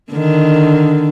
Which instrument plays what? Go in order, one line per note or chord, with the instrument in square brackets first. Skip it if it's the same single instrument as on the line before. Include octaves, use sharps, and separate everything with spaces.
[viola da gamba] D3 D#3